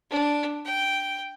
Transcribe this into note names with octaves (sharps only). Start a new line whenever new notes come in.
D4
G5